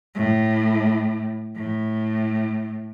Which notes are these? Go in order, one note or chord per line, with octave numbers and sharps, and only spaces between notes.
A2
A2